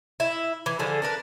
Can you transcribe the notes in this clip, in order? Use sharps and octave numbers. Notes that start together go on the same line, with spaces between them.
E4
E3
D3 F3 G#4 A4
D4 A#4 B4